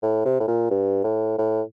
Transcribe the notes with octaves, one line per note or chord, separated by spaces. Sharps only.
A2
C3
A2
A#2
G2
A2
A2